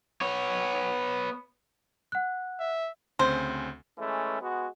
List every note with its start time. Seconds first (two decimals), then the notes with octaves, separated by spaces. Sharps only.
0.21 B3 C#5
2.12 F#5 F#6
2.60 E5
3.19 D2 C#3 C4 C5
3.98 E3 G#3 A3 C#4
4.41 G#3 B3 F#4